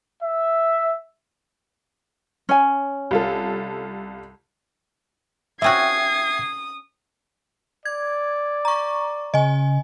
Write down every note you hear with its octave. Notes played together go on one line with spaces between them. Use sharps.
E5
C#4 G#5
C2 F4 A4
C4 C#4 F#4 E5 G5 D#6 G#6 C7
D5 G#6
A#5 C#6
C#3 D#5 G#5